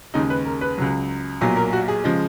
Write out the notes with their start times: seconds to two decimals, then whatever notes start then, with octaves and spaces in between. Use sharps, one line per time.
0.14 D#2 C#3 G#3 D#4
0.30 B4
0.45 A#4
0.61 B4
0.78 C#2 C#3 F#3
1.41 B1 A#2 F#3
1.56 A#4
1.73 F#4
1.88 G#4
2.04 C#3 F3 G#3